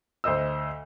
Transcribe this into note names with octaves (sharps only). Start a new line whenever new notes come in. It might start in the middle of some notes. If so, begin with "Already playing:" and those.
D2 C5 D#5 E6